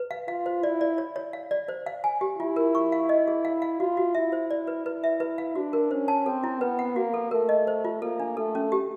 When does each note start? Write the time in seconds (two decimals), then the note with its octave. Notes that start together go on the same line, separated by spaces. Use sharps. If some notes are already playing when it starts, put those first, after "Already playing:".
Already playing: B4
0.11 F5
0.28 F4 F5
0.46 C5
0.63 E4 D5
0.81 D5
0.98 C#5
1.16 C#5
1.33 F5
1.51 D5
1.68 C5
1.86 F5
2.04 G#5
2.21 G4
2.39 E4 F4
2.56 A#4
2.75 C#6
2.92 F5
3.09 D#5
3.28 G#4
3.45 F5
3.62 F5
3.80 F4 F#4
3.97 F#4
4.15 E4 E5
4.32 C5
4.51 D5
4.67 B4
4.86 E4 B4
5.04 E5
5.20 B4
5.38 F5
5.55 D4 F#4
5.73 A#4
5.91 C#4 C5
6.08 A5
6.26 C4 A4
6.44 E4
6.61 B3 B4
6.79 F#5
6.96 A#3 F#4
7.14 A4
7.31 A3 A#4
7.49 D#5
7.67 C5
7.85 F4
8.02 A#3 A4
8.20 D4
8.37 A3 A4
8.55 C#4
8.72 G4